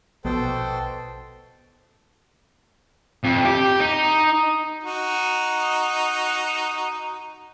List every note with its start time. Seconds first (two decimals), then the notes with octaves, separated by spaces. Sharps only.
0.25 A#1 B2 A4 C5 G5
3.24 F2
3.46 G4
3.80 D#4
4.84 D#4 F#4